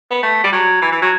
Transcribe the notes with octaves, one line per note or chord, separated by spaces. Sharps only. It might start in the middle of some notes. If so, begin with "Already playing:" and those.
B3
A3
G3
F#3
E3
E3
F#3